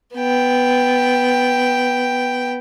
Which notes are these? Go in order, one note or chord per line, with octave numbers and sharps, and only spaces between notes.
B3 G5